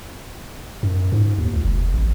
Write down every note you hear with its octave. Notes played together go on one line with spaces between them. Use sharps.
F#2
G#2
D#2
C#2
F1
A1